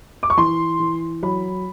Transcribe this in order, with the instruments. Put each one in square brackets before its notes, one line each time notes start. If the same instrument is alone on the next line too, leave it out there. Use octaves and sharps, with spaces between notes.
[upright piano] D6
C#6
E3 C6
E3
F#3 B5